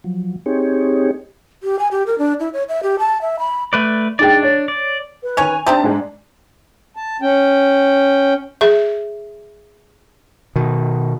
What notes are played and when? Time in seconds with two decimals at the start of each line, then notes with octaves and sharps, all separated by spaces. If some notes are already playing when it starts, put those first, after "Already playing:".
0.04 F3 F#3
0.46 C4 D#4 G4 G#4 C#5
1.63 G4
1.79 G#5
1.91 G4
2.06 A#4
2.18 D4
2.40 E4
2.53 C#5
2.69 E5
2.83 G4
2.99 A5
3.21 E5
3.39 B5
3.73 A3 B4 D5
4.19 D4 D#4 G#4 D5 G5
4.43 C#5
4.68 D5
5.23 B4
5.37 D#3 C#4 C#5 G#5 F7
5.66 G3 C4 D4 D#4 E5 A5
5.83 G#2 G#3
6.96 A5
7.22 C#4 G5
8.61 G#4 E5
10.56 B2 D#3